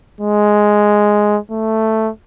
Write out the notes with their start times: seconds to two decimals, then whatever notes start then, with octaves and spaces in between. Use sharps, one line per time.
0.20 G#3
1.51 A3